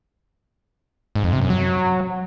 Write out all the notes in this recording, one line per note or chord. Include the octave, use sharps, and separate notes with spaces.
G#2
F2
C3
F#2
F#3